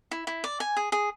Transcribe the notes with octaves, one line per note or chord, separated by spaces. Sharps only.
E4
E4
D5
G#5
G#4
G#4